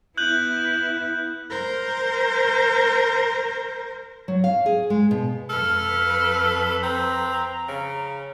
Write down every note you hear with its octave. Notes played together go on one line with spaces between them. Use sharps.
B3 E4 F#6 G6 F#7
A#4 C5
F#3
F5
G#4
G#3
B2
F2 A4 B4 F6
C4 A#5
C#3